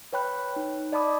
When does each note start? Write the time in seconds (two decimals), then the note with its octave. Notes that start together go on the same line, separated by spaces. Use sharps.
0.13 B4 C#5 G5 B5 F#6
0.56 D#4
0.92 D5 D#5 A5 B5 D6 D#6